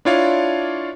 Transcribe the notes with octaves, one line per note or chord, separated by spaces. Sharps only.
D4 E4 F4 C#5 D5 F5